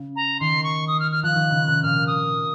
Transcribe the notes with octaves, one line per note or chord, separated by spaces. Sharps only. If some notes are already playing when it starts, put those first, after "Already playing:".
Already playing: C#3
A#5
D#3 C6
C#6
D#6
F6
F6
F3 F#6
D#3
C#3
C3
A#2 F6
D#6